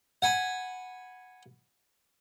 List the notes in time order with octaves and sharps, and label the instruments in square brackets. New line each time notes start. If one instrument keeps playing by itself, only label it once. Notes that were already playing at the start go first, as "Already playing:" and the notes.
[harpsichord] F#5 G#5 B5